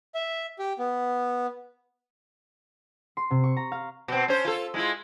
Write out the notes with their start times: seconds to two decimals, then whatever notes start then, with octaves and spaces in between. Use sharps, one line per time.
0.15 E5
0.59 G4
0.79 B3
3.17 C6
3.31 C3
3.44 C#6
3.57 A#5
3.72 F5
4.08 B2 C4
4.28 C#4 C5
4.45 F4 A4
4.74 G#3 E4 F4